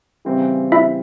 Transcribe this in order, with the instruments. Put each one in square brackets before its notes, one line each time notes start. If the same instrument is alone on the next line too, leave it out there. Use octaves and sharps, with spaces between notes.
[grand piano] C#3 E3 G3 C4
[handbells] E4 E5